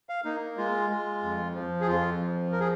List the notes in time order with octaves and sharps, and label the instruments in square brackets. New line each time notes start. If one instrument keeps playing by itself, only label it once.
[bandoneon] F5
A#3 D#4
G#3 F4
G#3
F2
F3
G#4
F2 F4
F3
A#4
G#4